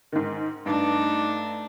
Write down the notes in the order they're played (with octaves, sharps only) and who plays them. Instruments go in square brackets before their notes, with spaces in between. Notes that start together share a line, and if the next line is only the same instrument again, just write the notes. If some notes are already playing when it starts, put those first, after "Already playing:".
[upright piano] G#2 D#3
[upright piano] G2 [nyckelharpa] A3 D4 [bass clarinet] D#4